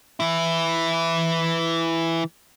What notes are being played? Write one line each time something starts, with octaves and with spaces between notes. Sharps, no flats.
E3 E4